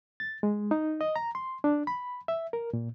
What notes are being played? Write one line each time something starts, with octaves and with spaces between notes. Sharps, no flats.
A6
G#3
D#4
D#5
A#5
C6
D4
B5
E5
A#4
A#2